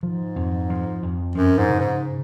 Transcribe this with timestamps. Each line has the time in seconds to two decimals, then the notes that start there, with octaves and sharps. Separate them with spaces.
0.03 G#2 F3
0.36 F2
0.70 F3
1.03 F2
1.35 F#2 F3
1.58 G#2
1.69 C#3
1.80 G#2